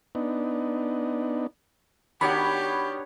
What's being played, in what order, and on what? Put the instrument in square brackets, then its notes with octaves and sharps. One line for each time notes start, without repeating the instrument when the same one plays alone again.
[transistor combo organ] B3 D4 D#4
[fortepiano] D#3 F#4 [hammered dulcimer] B3 D4 C#5 [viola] G4 [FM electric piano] B5